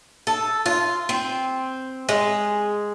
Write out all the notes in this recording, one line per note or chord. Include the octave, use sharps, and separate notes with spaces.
A4
F4
C4
G#3